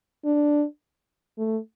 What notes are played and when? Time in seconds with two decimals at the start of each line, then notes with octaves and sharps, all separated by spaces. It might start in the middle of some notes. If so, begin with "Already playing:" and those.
0.25 D4
1.38 A3